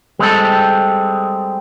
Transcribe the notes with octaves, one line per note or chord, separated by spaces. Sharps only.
G3 G#3 C4 A4